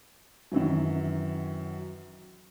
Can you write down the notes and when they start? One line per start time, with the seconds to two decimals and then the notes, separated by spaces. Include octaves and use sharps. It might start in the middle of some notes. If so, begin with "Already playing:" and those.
0.52 F#2 D#3 E3 F#3